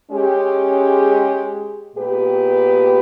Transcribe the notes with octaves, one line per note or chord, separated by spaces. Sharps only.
G#3 C#4 G4
A#2 G#3 B3 G4 B4